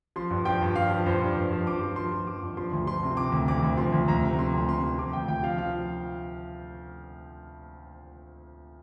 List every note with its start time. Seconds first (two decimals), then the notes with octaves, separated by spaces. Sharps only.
0.16 F3 C6
0.30 G2
0.45 F3 G5
0.62 G2
0.76 F3 F5
0.91 F3
1.06 G2 C5
1.21 G2
1.37 G2
1.52 F3
1.67 F3 D6
1.81 F3
1.96 F3 C6
2.11 F3
2.27 F3 D6
2.42 G2
2.57 F3 C6
2.72 D2
2.87 F3 C6
3.03 C3
3.17 C3 D6
3.32 D2
3.48 D2 D6
3.63 D2
3.77 F3 C6
3.92 D2
4.08 D2 A#5
4.23 C3
4.38 F3 C6
4.53 D2
4.69 C3 C6
4.83 F3
4.98 F3 D6
5.13 D2 G5
5.28 D2 G5
5.43 F3 F5
5.58 F3 F5